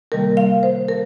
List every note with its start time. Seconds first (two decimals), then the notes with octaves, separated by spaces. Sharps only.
0.12 C3 D#3 G3 A#3 A#4
0.37 F5
0.63 C5
0.89 A#4